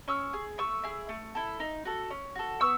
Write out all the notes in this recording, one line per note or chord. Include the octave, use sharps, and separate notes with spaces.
C#4 C#6 E6
G#4
A3 C#6 E6
E4 G#4
A3
E4 A4
D#4
F#4 A4
C#4
F#4 A4
B3 C#6 E6